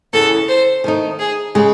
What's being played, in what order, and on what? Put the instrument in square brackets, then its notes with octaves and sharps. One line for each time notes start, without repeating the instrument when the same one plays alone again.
[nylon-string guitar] E2 C#3 E3 [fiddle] A4
[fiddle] C5
[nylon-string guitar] D#3 A3 D#4
[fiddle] G#4
[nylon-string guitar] C#3 G#3